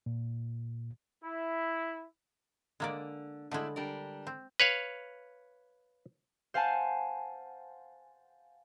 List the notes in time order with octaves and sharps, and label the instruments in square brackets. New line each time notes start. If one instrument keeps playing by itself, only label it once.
[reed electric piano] A#2
[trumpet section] E4
[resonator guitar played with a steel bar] D3 [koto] G#3 A#3 D5
[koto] D3 G#3 [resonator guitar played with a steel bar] A3 D4 E4
[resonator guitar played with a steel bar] G3 D4 A#4
[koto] C4
[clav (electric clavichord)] B4 C#5 F5
[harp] C5 F5 F#5 G#5 A5